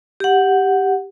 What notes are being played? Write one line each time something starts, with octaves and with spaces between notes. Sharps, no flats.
G4 F#5